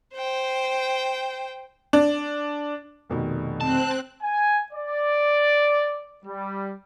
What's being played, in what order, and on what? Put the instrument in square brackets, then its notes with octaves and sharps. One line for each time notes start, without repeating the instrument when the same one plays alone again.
[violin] C5 G5
[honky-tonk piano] D4
[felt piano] F1 B2 D#3
[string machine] C4 F#6 [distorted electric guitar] A5
[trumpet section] G#5
D5
G3